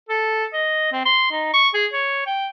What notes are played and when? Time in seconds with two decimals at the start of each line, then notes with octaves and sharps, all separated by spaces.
0.09 A4
0.53 D#5
0.92 C4
1.05 C6
1.31 D#4
1.53 C#6
1.74 G#4
1.93 C#5
2.26 G5